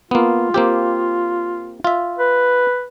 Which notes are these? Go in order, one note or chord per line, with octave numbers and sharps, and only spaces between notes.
A#3 B3 F4
A#3 C4 G4
F4 E5
B4